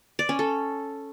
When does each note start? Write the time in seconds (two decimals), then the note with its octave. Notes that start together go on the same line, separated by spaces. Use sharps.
0.19 D5
0.29 C#4
0.39 A4